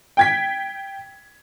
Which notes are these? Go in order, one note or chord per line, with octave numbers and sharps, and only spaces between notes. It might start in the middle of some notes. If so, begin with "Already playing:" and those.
G5 G#6 B6